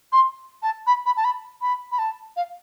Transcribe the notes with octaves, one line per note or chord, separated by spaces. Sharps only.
C6
A5
B5
B5
A5
B5
B5
B5
A5
F5